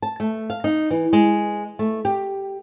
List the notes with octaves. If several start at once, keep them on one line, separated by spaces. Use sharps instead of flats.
A5
A3
F5
D#4
E3
G#3
A3
G4